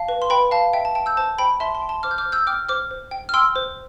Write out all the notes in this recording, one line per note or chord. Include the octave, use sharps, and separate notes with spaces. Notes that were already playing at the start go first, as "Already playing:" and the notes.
Already playing: F5 A5
B4
C6
B4 G5 B5
F5 A5
E5 G5
A5
G5 A5
E6 G6
C5 A5
C5 G5 B5
E5 A5 C6
A5 C6
G5
A5 C6
C5 D6 F6
G6
D6 F6
C5
E6 G6
G5 D6 F6
C5 D6 F6
C5
G5
F6
G5 C6 E6
C5